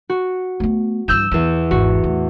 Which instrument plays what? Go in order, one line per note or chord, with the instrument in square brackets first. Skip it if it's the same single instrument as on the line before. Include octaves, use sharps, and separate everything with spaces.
[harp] F#4
[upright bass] A3 B3
[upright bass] G2 E3 [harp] E6 G6 E7
[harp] E2 E7 [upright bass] E3
[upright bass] G#1 [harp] F#4
[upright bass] A2